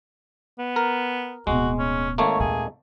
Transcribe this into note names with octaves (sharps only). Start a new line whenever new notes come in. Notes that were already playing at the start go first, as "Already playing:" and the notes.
B3
A#4
D1 B2 G#3 F#4
C#4
G#1 A3 A#3 C#5
D#2 A#2 G#4